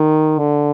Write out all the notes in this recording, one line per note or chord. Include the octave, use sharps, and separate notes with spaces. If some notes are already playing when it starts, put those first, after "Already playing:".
Already playing: D#3
D3